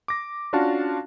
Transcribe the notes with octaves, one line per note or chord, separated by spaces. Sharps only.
D6 A#6
C#4 D4 F4 F#4 F5 A5